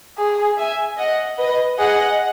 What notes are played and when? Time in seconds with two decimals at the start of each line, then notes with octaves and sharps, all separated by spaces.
0.18 G#4
0.58 E5 G#5
0.98 D#5 F#5
1.38 B4 D#5
1.78 G#4 D#5 F#5